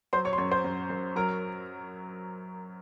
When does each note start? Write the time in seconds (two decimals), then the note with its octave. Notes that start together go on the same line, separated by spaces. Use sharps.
0.13 F#3 C5 C6
0.25 C#5 C#6
0.33 C6
0.38 F#2 C#5 C#6
0.51 C5 C6
0.64 F#2
0.90 F#2
1.16 F#3 A#4 A#5